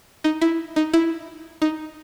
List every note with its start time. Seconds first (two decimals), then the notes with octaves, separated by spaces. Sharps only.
0.24 D#4
0.41 E4
0.76 D#4
0.93 E4
1.62 D#4